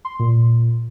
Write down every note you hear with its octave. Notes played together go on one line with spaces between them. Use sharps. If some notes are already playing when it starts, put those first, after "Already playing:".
C6
A#2